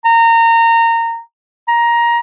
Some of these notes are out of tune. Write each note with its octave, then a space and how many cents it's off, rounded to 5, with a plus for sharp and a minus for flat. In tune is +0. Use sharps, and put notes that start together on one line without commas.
A#5 -25
A#5 +15